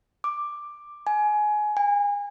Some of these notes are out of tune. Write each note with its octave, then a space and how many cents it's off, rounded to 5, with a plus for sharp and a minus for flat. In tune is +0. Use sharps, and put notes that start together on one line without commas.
D6 +5
G#5 +20
G#5 -30